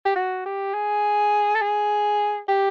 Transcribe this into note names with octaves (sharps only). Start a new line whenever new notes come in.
G4
F#4
G4
G#4
A4
G#4
G4